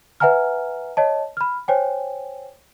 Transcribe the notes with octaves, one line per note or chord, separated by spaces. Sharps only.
B4 E5 F#5 G#5 A#5 F6
C#5 D#5 A5
B5 F6
C5 C#5 G5 G#5